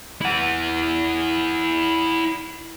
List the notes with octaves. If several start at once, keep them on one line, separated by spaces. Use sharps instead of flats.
E4 F#5